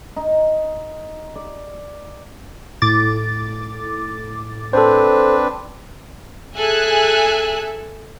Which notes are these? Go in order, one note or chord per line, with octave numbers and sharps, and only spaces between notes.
D#4
D5
A2 D6 A6
C4 D4 A4 B4 C5
G#4 A4 E5 G#5 F#6